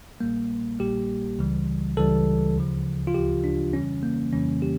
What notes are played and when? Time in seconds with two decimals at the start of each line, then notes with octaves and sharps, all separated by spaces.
0.20 A#1 A#2 G3 A#3
0.79 A#1 A#2 G3 G4
1.39 C#2 C#3 E3 G3
1.97 C#2 C#3 E3 G3 A4
2.56 D2 C#3 F3
3.07 F4
3.14 D2 C#3 F3 G4
3.44 D4
3.73 F2 C#3 E3 G3 C#4
4.03 A#3
4.32 F2 C#3 E3 G3 C#4
4.62 G4